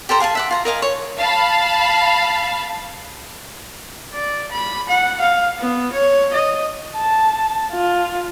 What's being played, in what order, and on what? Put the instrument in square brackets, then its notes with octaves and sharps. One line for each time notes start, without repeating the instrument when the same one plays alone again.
[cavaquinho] G4 A4 C5 A#5
G#4 F5 G#5 A5
E5 F#5 D6
F4 G#5 A#5
A#4 D#5 F5 G#5
C#5
[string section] F5 A5 B5
[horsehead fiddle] D5
B5
F#5
F5
B3
C#5
D#5
[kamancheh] A5
F4